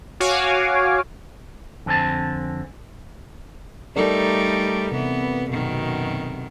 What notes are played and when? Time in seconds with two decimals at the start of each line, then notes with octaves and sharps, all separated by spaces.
0.20 F#4 C#5 F5 G#5 D6
1.86 F2 D3 C4 G#5 A5
3.96 G3 A3 D#4 A4 A#4 D5
4.92 C3 E3 B3
5.50 F#2 B2 D#3